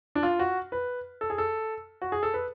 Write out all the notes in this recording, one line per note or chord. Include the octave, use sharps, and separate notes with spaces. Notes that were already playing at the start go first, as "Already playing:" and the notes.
D4
F4
F#4
B4
A4
G#4
A4
F#4
G#4
A4
B4